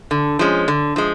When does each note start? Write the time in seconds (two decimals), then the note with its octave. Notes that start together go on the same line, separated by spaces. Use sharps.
0.11 D3
0.39 F3 G#3 C#4
0.68 D3
0.96 F3 G#3